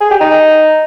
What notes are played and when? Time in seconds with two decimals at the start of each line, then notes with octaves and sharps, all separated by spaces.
0.01 G#4
0.11 G4
0.21 D#4